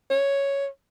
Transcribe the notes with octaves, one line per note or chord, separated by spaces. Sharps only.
C#5